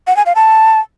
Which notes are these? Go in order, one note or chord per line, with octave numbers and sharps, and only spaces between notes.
F#5
G#5
F5
A5